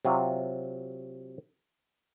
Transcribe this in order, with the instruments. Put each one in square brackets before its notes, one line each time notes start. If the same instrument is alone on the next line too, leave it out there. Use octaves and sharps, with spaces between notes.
[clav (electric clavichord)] C3 F#3 F4